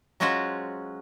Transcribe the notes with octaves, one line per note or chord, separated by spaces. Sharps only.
F#3 G#3 C#4 F4 F#4 C5